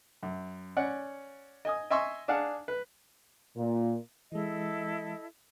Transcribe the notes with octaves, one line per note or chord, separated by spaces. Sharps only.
F#2
C#4 D5 F#5
D#5 G#5 D#6
D#5 E5 G#5 C6 C#6 E6
D4 G#4 F5 F#5 A5
B4
A#2
E3 G#3 E4 A4 D#5